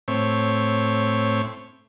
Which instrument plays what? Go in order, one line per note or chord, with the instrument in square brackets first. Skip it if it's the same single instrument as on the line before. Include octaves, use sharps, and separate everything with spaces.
[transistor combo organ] A2 C4 C#5